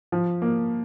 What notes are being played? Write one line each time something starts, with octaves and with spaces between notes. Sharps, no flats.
F3
A#3